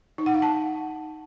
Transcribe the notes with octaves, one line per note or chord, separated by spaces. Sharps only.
D#4
F#5
F5
A5